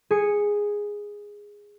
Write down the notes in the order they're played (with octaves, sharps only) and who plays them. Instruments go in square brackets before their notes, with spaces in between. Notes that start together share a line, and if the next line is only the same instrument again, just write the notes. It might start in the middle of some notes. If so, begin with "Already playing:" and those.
[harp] G#4 C#7